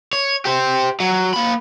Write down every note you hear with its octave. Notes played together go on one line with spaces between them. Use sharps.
C#5
G4 C5
F#3
A#3 B5